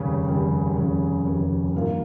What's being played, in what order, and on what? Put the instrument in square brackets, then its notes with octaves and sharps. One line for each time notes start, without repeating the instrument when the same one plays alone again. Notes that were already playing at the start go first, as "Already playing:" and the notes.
Already playing: [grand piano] F1 D#2 C#3 G3 C#4
F1 D#2 C#3 G3 C#4
F1 D#2 C#3 G3 C#4
F1 D#2 C#3 G3 C#4
G2 D#3 A#3 F4